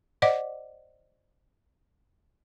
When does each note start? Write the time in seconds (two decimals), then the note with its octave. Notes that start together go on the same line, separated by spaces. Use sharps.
0.22 C5 D5 D#5 F#5 D6